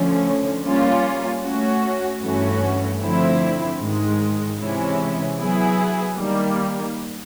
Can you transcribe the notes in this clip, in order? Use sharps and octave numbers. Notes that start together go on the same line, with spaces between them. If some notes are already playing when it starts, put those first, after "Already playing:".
Already playing: D3 F3 A3 C#4
G3 A#3 C#4 F4
A3 C#4 F#4
G2 E3 A3 C#4 F#4
D3 F3 A3 C4 E4
G#2 D#3 G#3
C3 E3 G#3 C#4 E4
F#3 B3 E4 G#4
D#3 G3 A#3